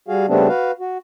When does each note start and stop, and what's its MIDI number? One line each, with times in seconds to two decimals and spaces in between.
0.08 0.26 55
0.08 0.26 66
0.08 0.26 68
0.08 0.26 77
0.28 0.48 49
0.28 0.48 55
0.28 0.48 57
0.28 0.48 59
0.28 0.48 60
0.28 0.48 62
0.48 0.71 66
0.48 0.71 71
0.48 0.71 77
0.80 0.98 66